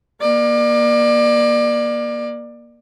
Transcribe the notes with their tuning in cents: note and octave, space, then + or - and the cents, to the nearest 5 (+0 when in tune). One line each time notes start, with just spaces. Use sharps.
A#3 +25 D5 +25